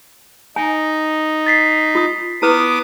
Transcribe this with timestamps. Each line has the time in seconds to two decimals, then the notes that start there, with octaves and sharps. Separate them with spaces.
0.56 D#4 G#5
1.47 A6 B6 C7
1.95 F4 D#6
2.42 B3 E4 B4 D6 D#6